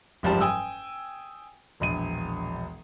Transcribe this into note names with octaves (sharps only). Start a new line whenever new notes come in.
F#1 G#2 F3 G3 G4 A5
G5 G#5 D#6 E6
E1 A#1 D#7